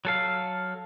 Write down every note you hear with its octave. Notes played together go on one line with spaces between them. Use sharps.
F#3 A4 F5